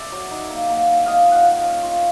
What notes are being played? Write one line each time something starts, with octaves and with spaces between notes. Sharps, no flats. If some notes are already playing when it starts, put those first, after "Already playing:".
Already playing: D5 E5
F#3
D#4
A#3
A#3
A#3
A#3 D#5 F5
F4
D#5 F5 F#5
A#3
C#4
F4